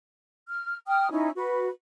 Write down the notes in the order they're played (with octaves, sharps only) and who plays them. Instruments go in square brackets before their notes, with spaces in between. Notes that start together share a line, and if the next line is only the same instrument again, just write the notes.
[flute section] F6
G5 D#6 F6
C#4 D#4 E4
F#4 B4